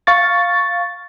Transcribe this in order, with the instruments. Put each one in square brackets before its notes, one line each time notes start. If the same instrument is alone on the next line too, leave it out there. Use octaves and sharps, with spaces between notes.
[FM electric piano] F5 C#6 A6